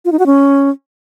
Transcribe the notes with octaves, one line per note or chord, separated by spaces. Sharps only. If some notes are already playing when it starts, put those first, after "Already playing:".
F4
D#4
F#4
C#4